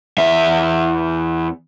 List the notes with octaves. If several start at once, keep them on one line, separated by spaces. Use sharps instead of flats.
E2 E5